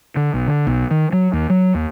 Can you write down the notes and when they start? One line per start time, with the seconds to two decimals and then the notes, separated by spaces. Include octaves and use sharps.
0.16 D3
0.34 B1
0.48 D3
0.67 B1
0.91 D#3
1.13 F#3
1.33 D#2
1.50 F#3
1.75 D#2